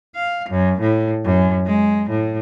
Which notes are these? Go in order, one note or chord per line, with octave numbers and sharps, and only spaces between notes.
F5
F#2
A2
F#2
G#3
A2